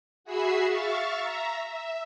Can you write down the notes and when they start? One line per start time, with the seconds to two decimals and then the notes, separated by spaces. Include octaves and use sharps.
0.24 F#4 G#4 E5 B5 E6 C7
0.66 E5 F5 C#6 A6
1.19 E5 A#5
1.66 E5